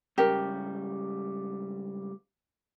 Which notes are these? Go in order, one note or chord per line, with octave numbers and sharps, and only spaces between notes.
G#2 C#3 G3 G4 A#4